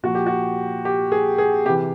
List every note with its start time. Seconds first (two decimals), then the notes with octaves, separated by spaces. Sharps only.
0.03 A#2 F3 F#4
0.15 G4
0.26 F#4
0.85 G4
1.12 G#4
1.38 G#4
1.65 C3 G4
1.69 E3